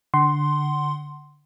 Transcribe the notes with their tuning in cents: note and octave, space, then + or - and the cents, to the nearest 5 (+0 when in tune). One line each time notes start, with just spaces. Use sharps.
D3 +0 F#5 +25 C6 +0